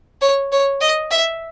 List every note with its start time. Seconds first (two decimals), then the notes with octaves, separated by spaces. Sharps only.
0.22 C#5
0.52 C#5
0.81 D#5
1.11 E5